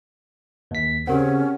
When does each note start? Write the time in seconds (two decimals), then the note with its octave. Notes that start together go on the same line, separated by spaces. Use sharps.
0.71 D#2 B6
1.07 C#3 C4 C#4 G4 A#4 F#5